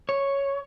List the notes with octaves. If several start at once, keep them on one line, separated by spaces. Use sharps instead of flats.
C#5